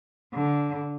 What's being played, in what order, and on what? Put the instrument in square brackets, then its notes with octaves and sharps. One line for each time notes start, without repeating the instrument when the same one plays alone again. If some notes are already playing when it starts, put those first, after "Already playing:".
[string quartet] D3